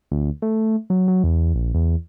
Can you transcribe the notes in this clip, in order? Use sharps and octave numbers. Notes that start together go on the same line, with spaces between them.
D2
A3
F#3
F#3
E2
A#1
E2